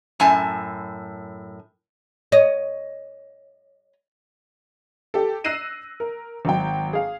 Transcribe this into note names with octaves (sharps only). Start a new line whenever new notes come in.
F#2 A2 G#5 A5
C#5 D#5
G4 A4
E6 F#6 A#6 C7 D#7 E7
A#4
G#1 F#3 G5
G#4 F5